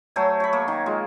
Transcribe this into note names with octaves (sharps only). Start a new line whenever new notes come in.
F#3 A3 C5 G#5
C#5 B5
A#3
D#3
G#3 F4